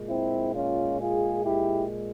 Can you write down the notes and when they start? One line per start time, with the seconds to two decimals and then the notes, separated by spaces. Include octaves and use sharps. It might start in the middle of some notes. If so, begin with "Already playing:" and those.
Already playing: A#2 G#3
0.09 C4 E4
0.55 C#4 F4
1.00 F4 G#4
1.45 E4 G4